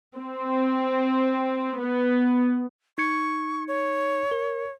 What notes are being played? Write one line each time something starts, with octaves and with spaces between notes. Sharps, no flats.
C4
B3
D#4 C#6 G#6 C#7
C#5
A#4